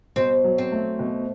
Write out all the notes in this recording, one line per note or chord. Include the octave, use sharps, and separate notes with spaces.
B2 C4
F#3
C4
A3
B2